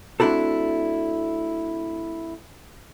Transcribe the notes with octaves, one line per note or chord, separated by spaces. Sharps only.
A3 C4 D4 E4 F#4 A4